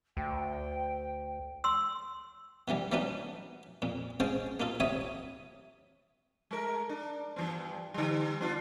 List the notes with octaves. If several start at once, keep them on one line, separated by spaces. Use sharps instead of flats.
D2 G5
C6 E6
B2 D#3 E3 G3
E3 F#3 A3 B3 D4 D#4
F2 A#2
C#3 G#3 C4 C#4 G5 A5
A#3 D#4 F4 A4
D2 C3 E4 C#5 E5 D#6
G#3 A3 A#4
D4
G2 E3 B3
D3 G3
B3 D4 F4